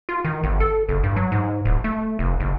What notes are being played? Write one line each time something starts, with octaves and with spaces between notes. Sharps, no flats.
F4
D#3
G1
A4
F#1
G2
F#3
G#2
D1
A3
F1
F#1